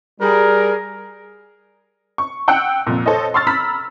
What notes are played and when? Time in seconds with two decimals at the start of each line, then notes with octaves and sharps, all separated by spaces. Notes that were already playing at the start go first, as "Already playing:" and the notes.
0.21 G3 G#4 A#4
2.18 C#6
2.48 F#5 G5 E6 F#6 C#7
2.87 F2 A#2
3.06 A4 C5 C#5 D#5
3.34 C6 C#6 E6 F6 A6
3.47 A#5 B5 E6 F6 B6